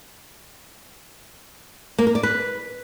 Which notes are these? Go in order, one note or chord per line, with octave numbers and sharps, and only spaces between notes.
A#3
A#4
D5
B4